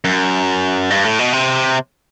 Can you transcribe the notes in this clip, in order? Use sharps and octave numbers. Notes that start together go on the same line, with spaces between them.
F#2
G2
A2
B2
C3